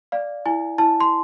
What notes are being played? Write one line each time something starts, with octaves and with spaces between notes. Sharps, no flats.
D5 F5
E4 G#5
E4 A5
C6